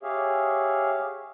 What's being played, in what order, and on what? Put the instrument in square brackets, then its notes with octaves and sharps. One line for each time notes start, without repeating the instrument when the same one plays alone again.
[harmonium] G4 G#4 C#5 E5 F5